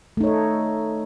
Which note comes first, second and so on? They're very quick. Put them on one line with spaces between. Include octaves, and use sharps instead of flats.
A3 D#4 C#5 A4